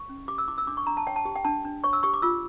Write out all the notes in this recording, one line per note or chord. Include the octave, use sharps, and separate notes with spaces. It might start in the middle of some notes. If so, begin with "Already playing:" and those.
Already playing: C#6
C#4
G4 D6
E6
E4 D6
E6
D4 D6
C#6
D4 A#5
A5
C#5 G5
A5
G4
G5
D4 A5
D4
C#5 C#6
E6
G4 C#6
D6
F4 E6